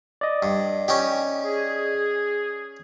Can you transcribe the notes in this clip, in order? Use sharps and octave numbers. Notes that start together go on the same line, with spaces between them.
D5 D#5
G2
C#4 D#4 G4
G#4